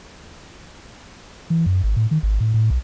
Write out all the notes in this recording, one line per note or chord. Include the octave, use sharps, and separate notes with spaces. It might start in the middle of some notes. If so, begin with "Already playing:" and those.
E3
F#2
G#1
A2
D#3
G#1
A2
A2
B1